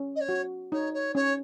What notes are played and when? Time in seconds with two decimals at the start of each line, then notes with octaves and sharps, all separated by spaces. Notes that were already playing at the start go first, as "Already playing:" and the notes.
Already playing: C#4
0.15 D#5
0.20 C#5
0.29 F#4
0.72 D#4 C#5
0.93 C#5
1.15 C#4 C#5